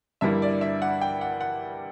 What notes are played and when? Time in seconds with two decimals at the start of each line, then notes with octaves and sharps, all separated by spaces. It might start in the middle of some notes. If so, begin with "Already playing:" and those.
0.21 G2 D3 G3 A#3 E4 E5
0.42 D5
0.61 E5
0.82 F#5
1.02 G5
1.21 F#5
1.41 F#5